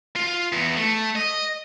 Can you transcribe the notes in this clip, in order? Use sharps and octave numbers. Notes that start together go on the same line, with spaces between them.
F4
E2
A3
D#5